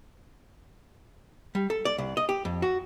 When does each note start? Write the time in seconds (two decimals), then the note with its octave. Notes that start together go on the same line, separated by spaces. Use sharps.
1.55 G3
1.70 A4
1.85 D5
1.98 C2
2.17 D#5
2.29 G4
2.45 F2
2.62 F#4